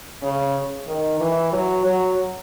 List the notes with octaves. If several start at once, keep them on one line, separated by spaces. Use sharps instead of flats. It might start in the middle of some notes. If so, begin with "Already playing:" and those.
C#3
D#3
E3
F#3
F#3